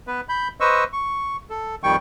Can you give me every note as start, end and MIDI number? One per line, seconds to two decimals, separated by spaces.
0.07 0.21 59
0.07 0.21 71
0.29 0.48 83
0.29 0.48 91
0.60 0.84 71
0.60 0.84 72
0.60 0.84 75
0.60 0.84 85
0.60 0.84 88
0.93 1.37 85
1.50 1.75 69
1.84 1.96 41
1.84 1.96 51
1.84 1.96 55
1.84 1.96 79
1.84 1.96 85